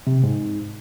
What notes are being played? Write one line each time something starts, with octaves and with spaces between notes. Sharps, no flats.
C3
G#2